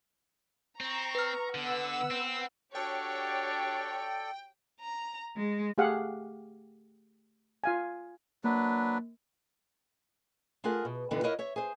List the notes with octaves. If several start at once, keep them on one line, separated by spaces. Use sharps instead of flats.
C4 A#5 C#6
B4 F6
D3 B3 F#5 E6
C4
D4 F#4 G4 A4 C#5 D5 G5
A#5
G#3
A3 G4 G#4 F5 F#5
F4 F5 G#5
F#3 A#3 D4 B4
A3 F4 G#4 A#4 F#5
B2
G2 A#2 D3 E3 B3 D#4
E4 A#4 C#5 D#5 F5 F#5
C#5 E5
G#4 C5